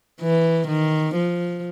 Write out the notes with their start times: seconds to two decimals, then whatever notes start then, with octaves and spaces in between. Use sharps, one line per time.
0.21 E3
0.68 D#3
1.15 F3